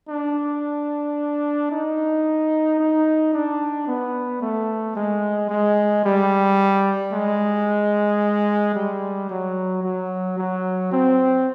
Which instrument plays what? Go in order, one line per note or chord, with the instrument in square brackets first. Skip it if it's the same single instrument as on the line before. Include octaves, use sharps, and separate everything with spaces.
[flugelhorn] D4
D#4
D#4
D4
B3
A3
G#3
G#3
G3
G#3
G3
F#3
F#3
F#3
C4